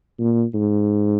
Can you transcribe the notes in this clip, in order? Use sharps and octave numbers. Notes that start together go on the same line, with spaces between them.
A#2
G#2